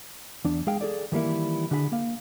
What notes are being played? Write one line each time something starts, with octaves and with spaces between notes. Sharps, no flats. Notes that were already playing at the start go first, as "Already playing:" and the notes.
E2 D4
G#3 G#4 F5 G5
G#4 A4 D5
D#3 E3 G3 A#3 E4
D3 D4 F#4 G#4 F#5 B5
A#3 F5